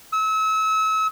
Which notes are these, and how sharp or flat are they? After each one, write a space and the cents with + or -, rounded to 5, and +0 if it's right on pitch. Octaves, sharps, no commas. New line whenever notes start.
E6 -35